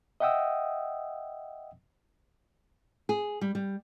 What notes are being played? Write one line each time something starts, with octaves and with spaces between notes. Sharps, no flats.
D#5 E5 F#5 G5 D#6 E6
G#4
G3
G3